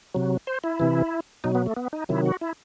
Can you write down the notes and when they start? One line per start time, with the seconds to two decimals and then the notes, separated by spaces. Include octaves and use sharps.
0.14 C3 F#3
0.47 C5
0.64 E4
0.80 C3 E3
1.44 B2 F#3 D#4
1.55 B3
1.66 A3
1.77 B3
1.93 D#4
2.09 C3 D#3 F#3 E4
2.25 F#4
2.41 E4